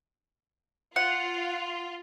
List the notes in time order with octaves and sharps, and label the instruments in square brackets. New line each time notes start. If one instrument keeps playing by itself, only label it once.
[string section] F4 [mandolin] F#5